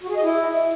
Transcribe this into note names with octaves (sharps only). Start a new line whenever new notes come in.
F#4
G#4
D#5
E4